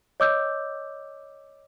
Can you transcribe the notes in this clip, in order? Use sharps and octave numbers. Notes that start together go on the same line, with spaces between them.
C#5 D#5 D6 E6 G6